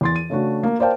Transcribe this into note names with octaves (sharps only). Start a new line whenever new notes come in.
E2 C6 A6
D#7
C#3 A3 D4 F#4
A#3
A#4 C5 D5 F5 G5 A5